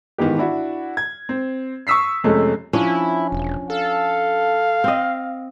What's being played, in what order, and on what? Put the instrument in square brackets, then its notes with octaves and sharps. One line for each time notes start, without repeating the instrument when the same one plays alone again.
[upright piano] G#2 D#3 E3 B3 G4
D4 E4 F#4
G#6
C4
C#6 D#6 E6 B6 C7
F2 C3 G#3 A3 C#4
[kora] F3 C#4 D4 [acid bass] E4
[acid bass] E1
[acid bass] A4 [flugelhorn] F5
[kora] C4 D#5